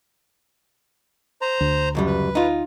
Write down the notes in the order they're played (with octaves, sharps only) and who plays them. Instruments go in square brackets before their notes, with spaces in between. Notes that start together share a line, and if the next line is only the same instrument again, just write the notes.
[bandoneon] C5 A#5
[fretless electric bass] D2
[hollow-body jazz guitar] C#2 F#2 G3
[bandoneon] B4
[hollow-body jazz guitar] D#4 F4